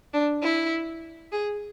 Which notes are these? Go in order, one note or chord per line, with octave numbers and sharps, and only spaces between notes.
D4
E4
G#4